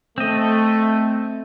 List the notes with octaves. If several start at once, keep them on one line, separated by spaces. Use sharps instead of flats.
A3 C4 D#5